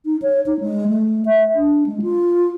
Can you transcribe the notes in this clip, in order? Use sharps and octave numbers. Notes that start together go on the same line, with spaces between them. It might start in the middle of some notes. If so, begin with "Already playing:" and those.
D#4
C#5
D#4
G#3
A3
E5
D4
G#3
F4